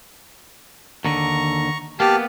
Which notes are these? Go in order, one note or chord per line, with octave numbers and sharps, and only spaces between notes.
D#2 D3 A#5 C#6
A#3 B3 G4 A5 F6